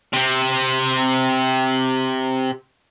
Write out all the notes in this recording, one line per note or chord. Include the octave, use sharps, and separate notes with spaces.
C3 C4